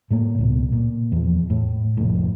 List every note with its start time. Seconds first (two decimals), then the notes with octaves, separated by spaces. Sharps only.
0.11 A2 A3 A#3
0.38 C#2 B2
0.72 A#2
1.12 E2 F3
1.50 A2
1.97 F1 A#1 A2